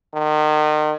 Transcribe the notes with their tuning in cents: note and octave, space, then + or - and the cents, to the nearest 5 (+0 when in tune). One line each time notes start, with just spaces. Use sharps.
D#3 -35